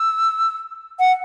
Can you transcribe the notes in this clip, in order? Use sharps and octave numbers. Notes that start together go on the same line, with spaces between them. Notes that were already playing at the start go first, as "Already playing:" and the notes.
Already playing: E6
F#5